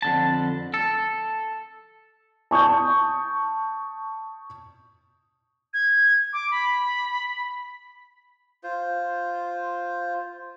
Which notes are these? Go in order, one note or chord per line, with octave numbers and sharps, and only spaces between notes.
F2 D3 A5
A4
A5 C#6 D#6 G6
G#6
D6
B5
F4 C5